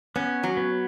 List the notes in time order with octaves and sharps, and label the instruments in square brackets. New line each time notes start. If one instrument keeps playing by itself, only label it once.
[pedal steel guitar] B3 [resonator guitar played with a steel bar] C#4
[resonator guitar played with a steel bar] F#3
[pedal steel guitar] B3